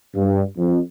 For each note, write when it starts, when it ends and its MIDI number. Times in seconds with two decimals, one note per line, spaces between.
0.15 0.41 43
0.58 0.78 41